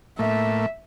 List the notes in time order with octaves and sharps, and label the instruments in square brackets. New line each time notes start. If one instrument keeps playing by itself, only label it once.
[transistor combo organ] A2 A3 A#3 [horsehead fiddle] E5